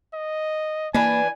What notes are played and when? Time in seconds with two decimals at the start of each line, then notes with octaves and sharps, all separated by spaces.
0.14 D#5
0.94 E3 A#3 D4 B4 G#5